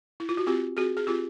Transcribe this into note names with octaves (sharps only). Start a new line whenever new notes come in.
E4
F4
F#4
C4 F4 G4
C4 F#4 G#4
G#4
C4 F4 G4